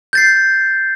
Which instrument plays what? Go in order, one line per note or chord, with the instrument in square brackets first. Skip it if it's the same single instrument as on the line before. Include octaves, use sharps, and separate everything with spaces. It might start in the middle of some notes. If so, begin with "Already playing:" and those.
[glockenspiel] G6 A6 C7